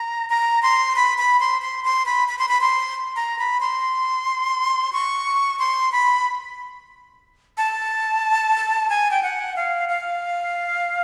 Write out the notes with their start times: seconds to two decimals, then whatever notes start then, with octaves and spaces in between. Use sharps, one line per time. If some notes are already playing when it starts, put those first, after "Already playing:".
Already playing: A#5
0.30 A#5
0.63 C6
0.96 B5
1.18 B5
1.40 C6
1.62 C6
1.84 C6
2.06 B5
2.28 B5
2.39 C6
2.49 B5
2.61 C6
3.16 A#5
3.39 B5
3.60 C6
4.93 C#6
5.59 C6
5.92 B5
7.58 A5
8.90 G#5
9.11 G5
9.23 F#5
9.56 F5
9.89 F5